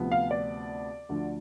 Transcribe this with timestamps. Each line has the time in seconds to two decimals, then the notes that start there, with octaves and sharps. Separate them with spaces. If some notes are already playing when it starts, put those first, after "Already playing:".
Already playing: D2 C3 F3 B3
0.12 F5
0.31 D5
1.09 D2 D3 F3